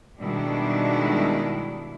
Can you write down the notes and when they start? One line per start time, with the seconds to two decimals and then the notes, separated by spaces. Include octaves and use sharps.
0.20 B2 D#3 G3 G#3 D4 E4